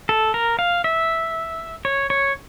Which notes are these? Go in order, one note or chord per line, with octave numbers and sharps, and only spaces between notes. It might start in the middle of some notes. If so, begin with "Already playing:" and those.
A4
A#4
F5
E5
C#5
C#5